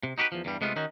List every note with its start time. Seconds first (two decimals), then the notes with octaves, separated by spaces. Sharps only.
0.03 C3
0.18 D#4 F#4 G4 A#4 B4
0.32 E2 F3
0.45 E2 G2 G3
0.61 C3 G#3 A3 B3 D4 F4
0.76 D#3 C#4 D#4 F#4